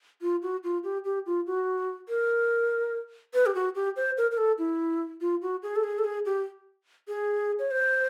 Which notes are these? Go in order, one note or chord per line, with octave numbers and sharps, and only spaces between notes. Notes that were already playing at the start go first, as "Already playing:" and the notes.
F4
F#4
F4
G4
G4
F4
F#4
A#4
B4
G4
F#4
G4
C5
A#4
A#4
A4
E4
F4
F#4
G#4
A4
G#4
A4
G#4
G4
G#4
C#5
C5